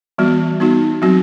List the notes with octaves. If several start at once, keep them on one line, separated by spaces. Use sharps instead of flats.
E3 G3 B3 F#4
B3 D#4 F#4
F#3 C4 F#4